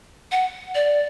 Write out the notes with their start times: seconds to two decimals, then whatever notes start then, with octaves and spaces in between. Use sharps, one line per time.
0.32 F#5
0.75 D5